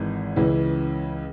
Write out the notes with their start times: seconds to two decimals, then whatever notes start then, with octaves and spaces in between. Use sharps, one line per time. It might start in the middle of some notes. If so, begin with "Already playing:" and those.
Already playing: G#1 G#2 E3
0.36 C#2 C#3 E3